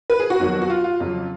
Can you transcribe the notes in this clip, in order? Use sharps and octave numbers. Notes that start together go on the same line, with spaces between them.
B4
G#4
F#4
F2 D#3 F#3 B3
F#4
F4
F4
F2 C#3 F#3